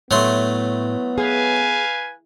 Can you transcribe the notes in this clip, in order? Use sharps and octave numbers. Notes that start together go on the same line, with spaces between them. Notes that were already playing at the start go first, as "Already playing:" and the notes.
A2 F#3 A3 B3 C6
G#4 B4 F5 G#5